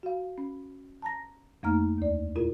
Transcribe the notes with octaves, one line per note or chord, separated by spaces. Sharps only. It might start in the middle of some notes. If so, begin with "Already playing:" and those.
F#4 F5
C#4
A5 A#5 A#6
F2 A3 A#3 D#4 A#5 F6
D#2 D5
A#2 E4 F4 A#4